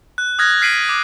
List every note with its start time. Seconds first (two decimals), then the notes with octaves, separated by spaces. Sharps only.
0.18 F#6
0.39 D#6 F6 F#6 G#6 A#6
0.61 F6 B6 C7 D7 D#7 F#7
0.89 D6